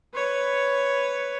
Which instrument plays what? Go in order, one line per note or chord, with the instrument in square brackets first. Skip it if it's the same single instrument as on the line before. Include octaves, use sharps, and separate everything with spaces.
[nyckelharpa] B4 C#5